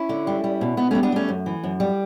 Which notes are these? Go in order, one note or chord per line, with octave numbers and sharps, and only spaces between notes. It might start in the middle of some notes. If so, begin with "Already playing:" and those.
Already playing: C#4 E4
D3
G3
G3
B2
B2 B3
G3 A3 C#4
B3 D4
G3 A3 C#4
F#2
E3
F#2
G3